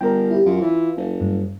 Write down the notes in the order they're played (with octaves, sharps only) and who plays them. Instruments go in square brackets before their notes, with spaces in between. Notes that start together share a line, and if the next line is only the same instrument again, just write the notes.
[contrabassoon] G1 [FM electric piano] A#4 G5
[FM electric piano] E4 G4
[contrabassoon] F#2 [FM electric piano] F4
[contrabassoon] E3
F#1
[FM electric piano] G2